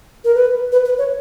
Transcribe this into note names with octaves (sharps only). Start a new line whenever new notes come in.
A#4
B4
B4
B4
C#5